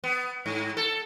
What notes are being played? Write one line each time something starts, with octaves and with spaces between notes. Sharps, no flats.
B3
G#2
A4